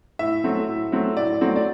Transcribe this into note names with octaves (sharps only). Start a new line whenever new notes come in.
A2 E5
F#3 A3 C4
A2
F#3 A3 C4
A2 D5
F#3 A3 C4
D5